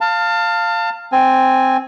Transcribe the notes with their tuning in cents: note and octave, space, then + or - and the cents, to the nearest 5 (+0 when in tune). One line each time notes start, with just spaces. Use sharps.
F5 +0 A5 +30
C4 +0 G#5 +0